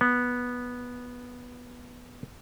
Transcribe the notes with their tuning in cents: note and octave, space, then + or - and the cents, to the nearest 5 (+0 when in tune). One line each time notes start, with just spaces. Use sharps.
B3 -10